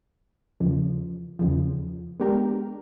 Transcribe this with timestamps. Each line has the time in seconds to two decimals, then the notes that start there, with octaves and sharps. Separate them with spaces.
0.60 E2 C#3 F3
1.39 E2 C#3 F3
2.20 G#3 B3 D4 G4 A#4